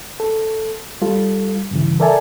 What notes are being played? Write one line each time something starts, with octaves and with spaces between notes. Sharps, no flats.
A4
G3 F4 A4
G2 C#3 E3
A4 A#4 D5 E5 G#5 A5